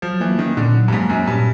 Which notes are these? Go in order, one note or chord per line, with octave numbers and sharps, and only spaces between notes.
F3 F#3
E3 A#3
D#3 C#4
A#2 D3
F#3
G2
G#2 A#3
F#2 C#4
G2 A#2